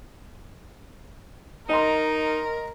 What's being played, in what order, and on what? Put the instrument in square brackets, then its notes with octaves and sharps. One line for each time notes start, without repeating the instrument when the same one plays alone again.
[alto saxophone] D#4 [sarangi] A#4 [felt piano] D#5 A#5 C6